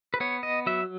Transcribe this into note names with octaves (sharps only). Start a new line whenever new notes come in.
B4
B3 C#5
D#5
F#3 E5